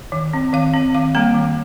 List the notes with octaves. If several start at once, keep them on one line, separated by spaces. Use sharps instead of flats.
D#3
C4
D#3 F5
C4
D#3 F5
G3 A#3 A#5
D#3